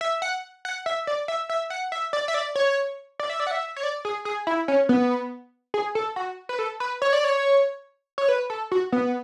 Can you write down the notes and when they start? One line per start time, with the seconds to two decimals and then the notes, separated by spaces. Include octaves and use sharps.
0.01 E5
0.22 F#5
0.65 F#5
0.86 E5
1.07 D5
1.28 E5
1.50 E5
1.70 F#5
1.92 E5
2.13 D5
2.28 E5
2.34 D5
2.56 C#5
3.20 D5
3.30 E5
3.40 D5
3.47 F#5
3.51 E5
3.76 C#5
3.83 D5
4.05 G#4
4.25 G#4
4.47 E4
4.68 C#4
4.89 B3
5.74 G#4
5.95 A4
6.16 F#4
6.49 B4
6.59 A4
6.80 B4
7.02 C#5
7.13 D5
7.24 C#5
8.18 C#5
8.29 B4
8.50 A4
8.72 F#4
8.92 B3